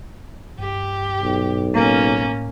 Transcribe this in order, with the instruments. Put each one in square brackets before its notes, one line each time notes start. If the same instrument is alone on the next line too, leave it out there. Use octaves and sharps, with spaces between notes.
[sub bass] G2 [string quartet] G4
[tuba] B1
[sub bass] A2 [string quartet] A#3 C#4